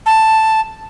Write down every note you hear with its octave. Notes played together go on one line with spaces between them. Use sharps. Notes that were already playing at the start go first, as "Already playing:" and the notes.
A5